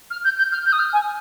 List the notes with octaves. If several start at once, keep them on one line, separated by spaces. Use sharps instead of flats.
F6
G6
G6
F6
G6
D#6
F6
G#5